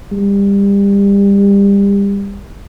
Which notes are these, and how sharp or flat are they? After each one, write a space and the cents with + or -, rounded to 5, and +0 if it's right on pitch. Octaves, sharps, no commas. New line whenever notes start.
G3 +30